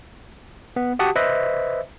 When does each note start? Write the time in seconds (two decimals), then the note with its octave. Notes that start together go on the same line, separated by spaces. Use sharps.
0.76 B3
0.99 F#4 G4 F#5 A5 D#6
1.16 B4 C5 D#5 E5